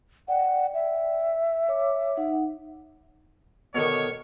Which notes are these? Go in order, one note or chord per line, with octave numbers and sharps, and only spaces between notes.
D5 F#5 G5
E5
C#5 D6
D#4 F#5
B2 D3 D#3 C#5